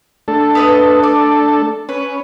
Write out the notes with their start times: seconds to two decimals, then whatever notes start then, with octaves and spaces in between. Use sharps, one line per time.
0.28 A3 D4 A4
0.55 B3 B4 D#5
1.03 D5
1.89 C#4 B4